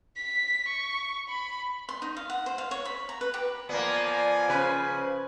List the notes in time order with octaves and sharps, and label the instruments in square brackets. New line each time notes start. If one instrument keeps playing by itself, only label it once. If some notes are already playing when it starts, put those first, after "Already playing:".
[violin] B6
C#6
B5
[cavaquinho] C6
D#4
F5
F#5
C5
F5
C#5
B5
A#5
B4
G4
[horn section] F3 G#5 [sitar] A#3 B3 [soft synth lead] D5
[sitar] C#3 B4 [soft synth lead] C5